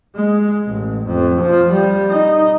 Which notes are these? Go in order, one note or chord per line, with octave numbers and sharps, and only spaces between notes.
G#3
A1
F2
F3
G3
D#4